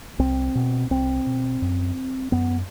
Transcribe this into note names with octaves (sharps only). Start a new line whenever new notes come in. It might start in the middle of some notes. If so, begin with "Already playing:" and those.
C2 C4
B2
C2 C4
B2
F#2
F#2 B3